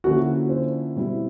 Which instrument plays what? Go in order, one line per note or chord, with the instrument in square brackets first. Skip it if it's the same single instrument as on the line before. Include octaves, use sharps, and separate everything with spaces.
[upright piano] D3 F3 A#3 C#4 E4 [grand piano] F#4
[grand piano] C5
[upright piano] B2 G3 C4 E4